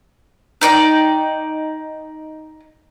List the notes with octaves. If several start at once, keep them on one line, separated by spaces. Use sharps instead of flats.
D#4 D5 G5